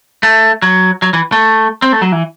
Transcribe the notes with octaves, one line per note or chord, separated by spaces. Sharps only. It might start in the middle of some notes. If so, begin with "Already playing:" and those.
A3
F#3
F#3
E3
A3
C4
A3
F#3
E3